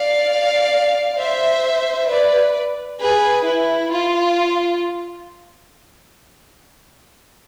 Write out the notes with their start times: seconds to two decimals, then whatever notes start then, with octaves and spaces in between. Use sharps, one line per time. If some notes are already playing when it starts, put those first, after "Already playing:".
Already playing: D5 F5
1.17 C5 E5
2.09 B4 D5
3.01 G#4 B4
3.47 E4
3.93 F4